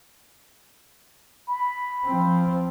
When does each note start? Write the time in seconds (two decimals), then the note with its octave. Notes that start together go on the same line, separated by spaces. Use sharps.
1.48 B5
2.06 F3 C4